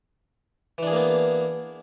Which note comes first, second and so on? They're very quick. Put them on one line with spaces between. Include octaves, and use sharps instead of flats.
E3 D4 G#4 A#3 B3